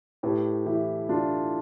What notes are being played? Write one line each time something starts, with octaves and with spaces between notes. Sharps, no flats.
A2 G4 B4
E3 E4 G4
E3 D4 F4